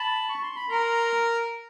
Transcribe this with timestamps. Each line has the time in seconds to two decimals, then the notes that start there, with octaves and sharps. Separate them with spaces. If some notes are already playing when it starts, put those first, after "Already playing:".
Already playing: A5 B5
0.29 C#6
0.43 C6
0.56 B5
0.69 A#4 A#5 C6